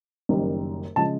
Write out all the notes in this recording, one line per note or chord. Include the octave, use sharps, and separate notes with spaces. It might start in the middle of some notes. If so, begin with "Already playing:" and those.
F#1 F#2 D#3 G3
C#3 F3 G#3 A5